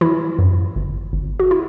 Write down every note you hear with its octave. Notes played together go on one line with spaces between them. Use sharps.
E3 E4
F#2
G1
G1
F#4
E4